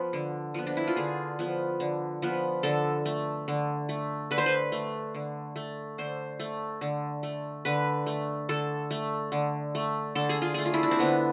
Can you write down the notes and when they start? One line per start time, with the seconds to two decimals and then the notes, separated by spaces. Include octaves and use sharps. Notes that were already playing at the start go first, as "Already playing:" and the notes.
Already playing: F3 B3
0.13 D3
0.54 F3 B3
0.67 D4
0.77 E4
0.87 F4
0.96 D3 G#4
1.39 F3 B3
1.80 D3
2.22 F3 B3
2.63 D3 A4
3.06 A3
3.48 D3
3.89 A3
4.31 D3 B4
4.38 C5
4.46 B4
4.72 A3
5.15 D3
5.56 A3
5.98 D3 C5
6.40 A3
6.81 D3
7.23 A3
7.65 D3 B4
8.06 A3
8.49 D3 A4
8.91 A3
9.32 D3
9.75 A3
10.15 D3 A4
10.29 G#4
10.42 F4
10.54 A3 G#4
10.65 F4
10.74 E4
10.83 D4
10.91 C4
10.99 D3 B3